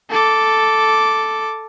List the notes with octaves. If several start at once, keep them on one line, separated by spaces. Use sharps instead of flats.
A4 D6